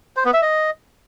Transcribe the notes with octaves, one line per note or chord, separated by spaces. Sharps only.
C5
B3
E5
D#5